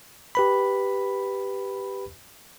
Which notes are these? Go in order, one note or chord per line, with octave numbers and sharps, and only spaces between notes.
G4 B4 B5